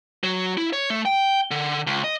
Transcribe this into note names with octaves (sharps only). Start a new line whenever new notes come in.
F#3
E4
C#5
A3
G5
D3
C#2
D#5